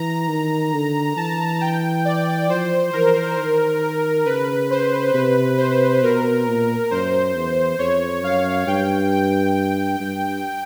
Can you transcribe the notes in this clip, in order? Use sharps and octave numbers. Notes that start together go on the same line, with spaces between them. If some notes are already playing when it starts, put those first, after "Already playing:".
Already playing: E3 A#5
D#3
D3
E3 A5
G5
D5
F3 C5
E3 A#4
D#3
C#3 B4
C5
C3 B4
C5
B2 A#4
A#2
F#2 C5
E2
F2 C#5
F#2 F5
G2 G5
G5
G2